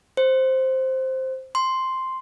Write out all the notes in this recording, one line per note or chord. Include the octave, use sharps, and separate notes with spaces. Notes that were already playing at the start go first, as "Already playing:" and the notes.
C5
C6